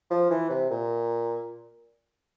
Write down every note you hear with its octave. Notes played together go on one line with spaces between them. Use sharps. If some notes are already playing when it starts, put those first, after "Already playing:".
F3
E3
C3
A#2